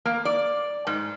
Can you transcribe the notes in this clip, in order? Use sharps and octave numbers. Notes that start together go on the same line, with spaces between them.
A#3
D5
G#2